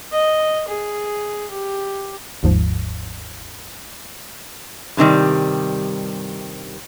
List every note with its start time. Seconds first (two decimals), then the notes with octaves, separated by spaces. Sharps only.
0.12 D#5
0.68 G#4
1.51 G4
2.43 G1 D#2 G#2 F3
4.97 G2 C3 D#3 G3